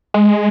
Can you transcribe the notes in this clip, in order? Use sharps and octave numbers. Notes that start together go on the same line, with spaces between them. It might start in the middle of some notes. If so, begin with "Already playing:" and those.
G#3